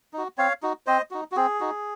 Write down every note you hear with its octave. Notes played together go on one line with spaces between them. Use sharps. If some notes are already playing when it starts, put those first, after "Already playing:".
D#4 F#4
C4 C#5 F5
D#4 F#4
C4 C5 D#5
D#4 F#4
F#4
C4 G#4
D#4 F#4